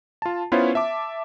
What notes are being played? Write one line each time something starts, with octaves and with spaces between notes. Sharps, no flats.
F4 A5
B3 C#4 E4 F4 C5 C#5
E5 A5 D6